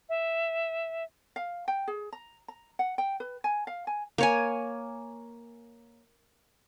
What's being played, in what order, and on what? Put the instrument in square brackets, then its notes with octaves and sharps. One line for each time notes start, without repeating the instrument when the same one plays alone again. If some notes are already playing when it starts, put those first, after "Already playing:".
[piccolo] E5
[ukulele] F5
G5
G#4
A#5
A#5
F#5
G5
B4
G#5
F5
G#5
[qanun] A#3 C#5 G#5